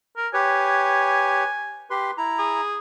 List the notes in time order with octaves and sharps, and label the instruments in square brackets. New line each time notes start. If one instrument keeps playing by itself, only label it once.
[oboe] A#4
[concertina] G4 B4 C#5 [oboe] G#5
[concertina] G4 B4 C6
E4 A#5
[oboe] G#4